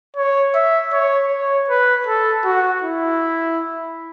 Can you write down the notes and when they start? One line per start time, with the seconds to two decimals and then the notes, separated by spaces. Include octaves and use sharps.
0.16 C#5
0.54 E5
0.92 C#5
1.31 C#5
1.69 B4
2.07 A4
2.45 F#4
2.83 E4